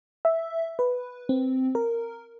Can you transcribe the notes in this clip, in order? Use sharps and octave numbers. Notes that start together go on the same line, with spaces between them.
E5
B4
C4
A#4